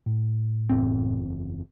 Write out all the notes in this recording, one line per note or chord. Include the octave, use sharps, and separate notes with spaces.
A2
F#1 E2 C4